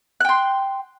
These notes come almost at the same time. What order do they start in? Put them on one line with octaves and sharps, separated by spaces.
F#6 G5 C6